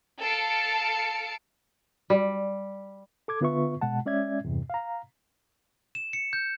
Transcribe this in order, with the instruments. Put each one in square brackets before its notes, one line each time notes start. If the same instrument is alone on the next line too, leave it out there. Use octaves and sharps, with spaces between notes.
[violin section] A4 F5 A5 C#7 D7
[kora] G3
[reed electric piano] A4 D6 G#6
D3 B3 F4 B4 E5 C#6
B2 G#3 F#5 A5
G#3 C#4 D5 E5 G#6
E2 G2 C3
F5 A#5
[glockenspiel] E7
C#7
G6